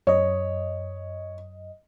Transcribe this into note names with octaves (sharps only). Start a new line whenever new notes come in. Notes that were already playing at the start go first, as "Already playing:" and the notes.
F#2 C#5 D#5